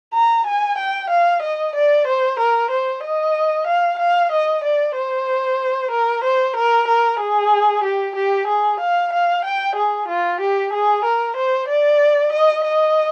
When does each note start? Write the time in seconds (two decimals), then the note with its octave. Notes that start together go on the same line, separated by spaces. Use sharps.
0.14 A#5
0.47 G#5
0.78 G5
1.10 F5
1.43 D#5
1.76 D5
2.07 C5
2.40 A#4
2.71 C5
3.04 D#5
3.67 F5
3.99 F5
4.32 D#5
4.64 D5
4.96 C5
5.91 A#4
6.24 C5
6.56 A#4
6.88 A#4
7.19 G#4
7.84 G4
8.16 G4
8.48 G#4
8.80 F5
9.13 F5
9.45 G5
9.76 G#4
10.08 F4
10.41 G4
10.73 G#4
11.05 A#4
11.37 C5
11.68 D5
12.33 D#5
12.64 D#5